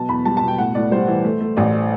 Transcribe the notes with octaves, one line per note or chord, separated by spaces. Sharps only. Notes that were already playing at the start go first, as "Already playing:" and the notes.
Already playing: B2 F#3 A5
E2 B5
G3 A5
A5
B2
G5
A2 F#5
A2 D5
G3 C5
E3
A3
A3
A1 D5